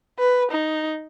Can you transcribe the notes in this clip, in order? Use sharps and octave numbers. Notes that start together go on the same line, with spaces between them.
B4
D#4